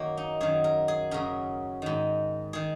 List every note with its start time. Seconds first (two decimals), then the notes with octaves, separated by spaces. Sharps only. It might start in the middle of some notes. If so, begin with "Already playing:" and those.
Already playing: F#2 D#3 A#3 C#4
0.17 D#4
0.41 F#2 D#3 G#4
0.64 A#4
0.88 G#4
1.11 F#2 C#3 A#4
1.82 G#2 D#3
2.53 D#3 G#4